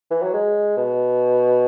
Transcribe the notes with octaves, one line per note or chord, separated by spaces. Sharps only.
E3
F#3
G#3
B2